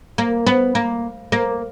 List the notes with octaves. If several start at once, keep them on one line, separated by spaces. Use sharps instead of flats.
A#3
B3
A#3
A#3